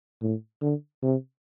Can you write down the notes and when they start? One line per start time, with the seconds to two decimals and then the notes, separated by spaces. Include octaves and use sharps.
0.22 A2
0.62 D3
1.03 C3